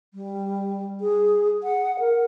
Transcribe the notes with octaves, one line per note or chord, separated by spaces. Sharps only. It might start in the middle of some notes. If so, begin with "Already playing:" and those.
G3
G#4
F#5
A#4